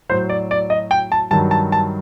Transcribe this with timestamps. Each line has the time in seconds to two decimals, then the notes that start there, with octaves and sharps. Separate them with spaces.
0.09 A2 F#3 C5
0.29 D5
0.51 D5
0.70 D#5
0.91 G5
1.12 A5
1.31 G2 D#3 F#3 A5
1.51 A5
1.72 A5